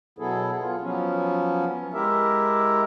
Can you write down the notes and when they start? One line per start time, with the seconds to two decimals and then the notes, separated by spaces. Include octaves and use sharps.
0.19 B2 F#3 B3 E4 G#4 A4
0.60 B3 F4
0.81 F3 F#3 B3 C#4
1.94 G#3 E4 G4 A#4 E5